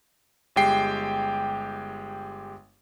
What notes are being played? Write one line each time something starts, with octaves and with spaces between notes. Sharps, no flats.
G1 G#3 G4 G5 C7